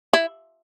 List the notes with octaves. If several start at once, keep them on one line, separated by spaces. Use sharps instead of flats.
E4